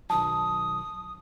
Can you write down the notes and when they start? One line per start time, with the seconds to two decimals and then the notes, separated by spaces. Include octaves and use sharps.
0.10 B1 D#3 F#3 A5 D#6